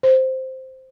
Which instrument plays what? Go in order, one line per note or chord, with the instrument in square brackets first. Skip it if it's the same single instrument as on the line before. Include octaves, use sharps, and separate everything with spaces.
[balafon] C5